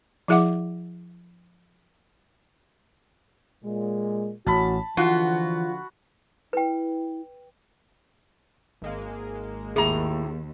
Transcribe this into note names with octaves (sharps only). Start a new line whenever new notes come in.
F3 E4 G#4 E5 F#5 D6
A#2 G#3
A1 C#4 F#4 A5 B5
D3 E3 F3 F4 F#4 F#5
E4 B4 G5
G#1 G#3 A#3
D#2 A2 G#4 A#5